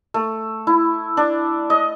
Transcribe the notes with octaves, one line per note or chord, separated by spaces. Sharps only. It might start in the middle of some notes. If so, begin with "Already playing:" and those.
A3
E4
D4
D#5